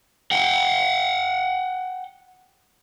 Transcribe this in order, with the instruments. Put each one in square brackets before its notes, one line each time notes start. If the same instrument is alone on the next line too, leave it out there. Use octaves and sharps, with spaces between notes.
[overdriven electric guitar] F#5 G5